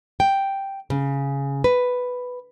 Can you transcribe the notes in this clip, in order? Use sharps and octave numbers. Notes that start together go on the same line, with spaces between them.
G5
C#3
B4